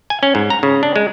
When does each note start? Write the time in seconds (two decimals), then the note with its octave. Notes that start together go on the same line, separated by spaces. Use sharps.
0.10 G#5
0.23 C#4
0.35 G#2
0.50 A#5
0.63 C#3
0.83 D4
0.96 G#3